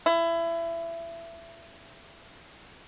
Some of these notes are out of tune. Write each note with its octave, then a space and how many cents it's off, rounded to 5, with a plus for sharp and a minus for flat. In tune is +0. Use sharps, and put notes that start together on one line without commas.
E4 +25